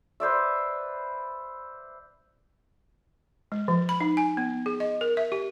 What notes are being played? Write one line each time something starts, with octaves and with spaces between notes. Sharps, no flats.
B4 C5 D5 E5
G#3
F3
B5
D#4
G#5
B3
G#4
D#5
A#4
E5
G4